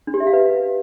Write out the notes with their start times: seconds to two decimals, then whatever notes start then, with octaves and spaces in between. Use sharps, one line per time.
0.07 D4
0.14 G4
0.20 E5
0.27 F5
0.33 B4